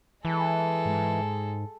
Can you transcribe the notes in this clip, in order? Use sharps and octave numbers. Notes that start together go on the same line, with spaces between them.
E3 G#3 A4
G#2